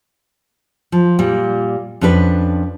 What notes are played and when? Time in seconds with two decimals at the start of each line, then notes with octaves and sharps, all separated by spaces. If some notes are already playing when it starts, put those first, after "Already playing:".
0.92 F3
1.19 A#2 G3
2.01 F2 C#4 D4 G4 B4